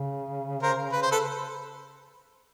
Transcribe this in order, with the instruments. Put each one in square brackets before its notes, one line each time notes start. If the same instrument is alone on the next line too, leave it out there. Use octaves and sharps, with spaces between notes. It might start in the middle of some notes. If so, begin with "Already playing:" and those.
Already playing: [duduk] C#3
[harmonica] A#4 C5
B4
C5
A4 B4